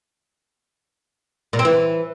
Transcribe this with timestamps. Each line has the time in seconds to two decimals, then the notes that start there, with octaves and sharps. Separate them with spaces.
1.53 A#2
1.59 C4
1.65 E3